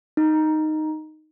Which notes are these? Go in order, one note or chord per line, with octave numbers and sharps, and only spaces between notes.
D#4